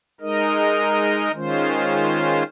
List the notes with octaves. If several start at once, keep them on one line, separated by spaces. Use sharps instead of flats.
G#3 D#4 A#4 D#5
D#3 G#3 C#4 F4 C5